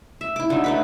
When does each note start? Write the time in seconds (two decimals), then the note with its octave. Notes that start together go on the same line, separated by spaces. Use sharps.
0.21 E5
0.36 E4 D6
0.50 D3 F#3 D#4
0.64 A3 B4 B5